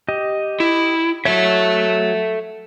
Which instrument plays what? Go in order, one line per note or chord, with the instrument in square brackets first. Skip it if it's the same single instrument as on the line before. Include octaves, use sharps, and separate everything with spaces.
[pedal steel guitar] G4 D#5
[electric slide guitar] E4
[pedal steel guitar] F#3 C#5 [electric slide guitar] A4 E5